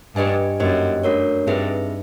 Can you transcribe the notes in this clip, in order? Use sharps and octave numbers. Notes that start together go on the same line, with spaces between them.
G2 G4 B4 D#5 G#5
F#2 A#3 D#4 G4 C5 D#5
A3 D4 F#4 A#4 C#5
G2 C4 D#4 G#4 B4 E5